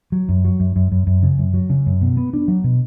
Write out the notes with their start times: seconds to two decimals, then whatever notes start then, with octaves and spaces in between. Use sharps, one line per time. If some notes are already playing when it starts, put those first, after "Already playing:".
0.12 F#3
0.29 F#2
0.45 F#3
0.60 F#2
0.76 F#2
0.92 F#2
1.07 F#2
1.23 C#3
1.38 F#2
1.54 F#3
1.70 C#3
1.86 F#2
2.01 B2
2.17 B3
2.33 D4
2.48 F#3
2.64 B2